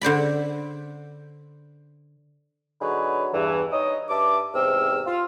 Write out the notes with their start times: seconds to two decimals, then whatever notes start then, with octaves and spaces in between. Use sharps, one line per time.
0.01 D3 C5 D5 B5
2.81 D3 F#3 D#4 G#4 B4 C#5
3.34 E2 G2 E3
3.73 D#4 C#5 D#5
4.10 G2 E5 A5 D6
4.54 E2 G#2 C3 C4 E6 F6
5.07 F4